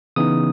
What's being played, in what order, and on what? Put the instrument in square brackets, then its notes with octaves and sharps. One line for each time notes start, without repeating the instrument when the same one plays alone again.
[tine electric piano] C#3 E3 B3 D#4 D#6